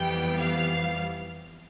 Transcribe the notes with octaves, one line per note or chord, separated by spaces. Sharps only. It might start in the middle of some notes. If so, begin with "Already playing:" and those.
Already playing: F2 E3 G3 B3 G5
F5